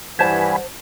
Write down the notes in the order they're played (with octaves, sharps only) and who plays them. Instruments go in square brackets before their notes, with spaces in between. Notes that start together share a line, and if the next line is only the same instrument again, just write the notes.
[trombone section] G2 E3 [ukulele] C5 A5 [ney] F#5 [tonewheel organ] G#5 B5